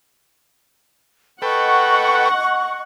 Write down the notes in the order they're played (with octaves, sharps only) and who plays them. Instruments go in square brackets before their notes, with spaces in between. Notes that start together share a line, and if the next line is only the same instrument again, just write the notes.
[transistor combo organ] A4 B4 G5 [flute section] D#5 C#6 [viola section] F#5